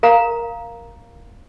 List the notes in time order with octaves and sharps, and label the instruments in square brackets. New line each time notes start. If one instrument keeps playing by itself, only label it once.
[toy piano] A#4 F5 A#5